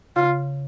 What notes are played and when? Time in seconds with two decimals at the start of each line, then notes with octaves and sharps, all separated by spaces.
0.16 C#3 F4